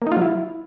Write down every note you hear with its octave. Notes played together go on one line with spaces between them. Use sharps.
A#3
D#4
F4
F#3
E4